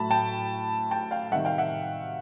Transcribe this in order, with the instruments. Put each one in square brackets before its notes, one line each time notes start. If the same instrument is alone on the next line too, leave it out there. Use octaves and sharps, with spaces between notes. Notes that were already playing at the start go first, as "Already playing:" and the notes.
Already playing: [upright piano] A2 F#3 A3 A5 B5
G5 A5
G5 A5
F5 G5
C3 D#3 G3 E5 F#5
F5 G5
E5 F#5